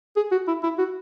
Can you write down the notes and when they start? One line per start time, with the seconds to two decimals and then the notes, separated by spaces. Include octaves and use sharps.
0.16 G#4
0.31 F#4
0.47 E4
0.63 E4
0.79 F#4